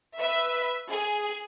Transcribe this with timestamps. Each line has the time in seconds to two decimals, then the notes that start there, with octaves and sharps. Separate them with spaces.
0.19 B4 E5
0.90 G#4